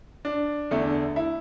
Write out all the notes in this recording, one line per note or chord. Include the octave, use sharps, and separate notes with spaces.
D4
E2 D3 A3
E4